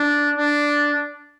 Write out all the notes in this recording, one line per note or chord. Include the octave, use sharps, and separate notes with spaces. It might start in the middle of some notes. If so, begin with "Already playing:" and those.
Already playing: D4
D4